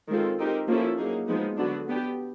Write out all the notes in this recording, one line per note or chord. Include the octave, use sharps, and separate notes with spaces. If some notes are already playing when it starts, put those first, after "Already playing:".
D#3 G#3 C4 F4 A4
C4 D#4 G4 A#4
F3 A#3 C#4 E4 A4
F#3 A#3 D#4 G#4
F3 G#3 B3 D#4
D3 F#3 B3 D4 F#4
B3 D4 G4